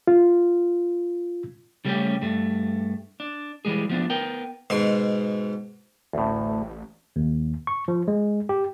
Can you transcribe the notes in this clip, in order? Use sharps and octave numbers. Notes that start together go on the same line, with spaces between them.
F4
C#3 G3 A3 C4 C#4 G4
G2 A3
D4
E3 G3 G#3 G#4
F3 B3 D4
B3 A#4 G5
G#2 B2 C6
A1 D2 A2
D#2
C#6
F3
G#3
G4